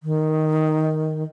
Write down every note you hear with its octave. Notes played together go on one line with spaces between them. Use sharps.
D#3